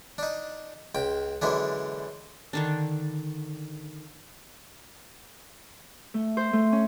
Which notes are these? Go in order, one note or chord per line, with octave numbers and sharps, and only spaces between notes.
D4 D#4
C#2 G5
F#2 D3 E3 G#3 D4
D3 D#3 D4
A3
C5
A3
C#4